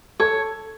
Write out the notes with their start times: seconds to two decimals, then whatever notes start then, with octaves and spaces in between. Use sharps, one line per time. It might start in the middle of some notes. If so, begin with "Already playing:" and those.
0.20 A4 C#5